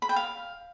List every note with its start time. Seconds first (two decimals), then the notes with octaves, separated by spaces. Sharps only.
0.02 B5
0.09 G5
0.16 F5